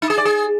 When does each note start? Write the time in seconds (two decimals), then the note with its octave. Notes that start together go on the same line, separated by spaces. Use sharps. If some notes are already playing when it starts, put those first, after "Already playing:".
0.02 D#4
0.10 G#4
0.18 D5
0.25 G#4